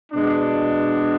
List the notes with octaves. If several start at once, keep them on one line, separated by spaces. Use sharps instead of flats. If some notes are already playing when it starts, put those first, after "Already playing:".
B2 G#3 D4